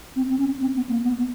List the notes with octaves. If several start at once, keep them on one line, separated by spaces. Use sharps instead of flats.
C4
C4
C#4
C4
B3
A#3
B3